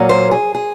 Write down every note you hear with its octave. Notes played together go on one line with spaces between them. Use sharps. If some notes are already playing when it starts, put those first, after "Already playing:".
Already playing: A#2 F#3 A#3 C#4
C5
G#4
G#4